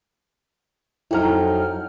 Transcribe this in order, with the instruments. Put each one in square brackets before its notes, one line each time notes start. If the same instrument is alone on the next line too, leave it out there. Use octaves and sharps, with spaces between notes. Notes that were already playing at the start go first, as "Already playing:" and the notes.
[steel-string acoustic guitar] F2 F#3 D#4 [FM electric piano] E4 F6